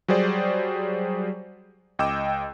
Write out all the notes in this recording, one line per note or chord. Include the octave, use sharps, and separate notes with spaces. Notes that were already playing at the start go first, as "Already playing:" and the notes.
F#3 G3 G#4 C5 D5
C#2 D#5 G5 D6 E6 E7